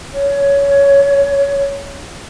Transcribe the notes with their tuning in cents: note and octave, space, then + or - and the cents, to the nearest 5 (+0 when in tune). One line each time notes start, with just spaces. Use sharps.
C#5 +15